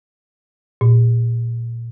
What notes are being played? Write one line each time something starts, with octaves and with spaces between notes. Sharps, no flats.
A#2